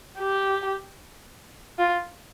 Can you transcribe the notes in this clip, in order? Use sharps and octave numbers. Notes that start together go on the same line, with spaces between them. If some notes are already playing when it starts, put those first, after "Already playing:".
G4
F4